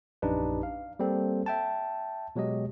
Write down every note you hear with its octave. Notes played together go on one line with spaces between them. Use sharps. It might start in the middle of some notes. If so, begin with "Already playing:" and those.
A#1 F#2 D4 D#4 G4 B4
F5
G3 A#3 C4 A4
E5 G5 A5
B2 F#3 G#3 G4 D#5